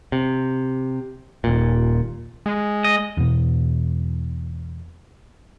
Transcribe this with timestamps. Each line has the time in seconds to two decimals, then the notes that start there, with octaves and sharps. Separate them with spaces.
0.12 C3
1.44 D#1 A#2
2.46 G#3
2.84 D#5
3.17 E2 B2